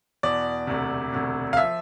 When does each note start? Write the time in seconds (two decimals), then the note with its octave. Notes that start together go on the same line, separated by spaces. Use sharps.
0.23 E2 B2 D5
0.67 E1 D2 C3
1.13 E1 D2 C3
1.53 F5
1.57 F3 E5